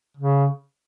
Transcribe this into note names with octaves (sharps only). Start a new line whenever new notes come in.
C#3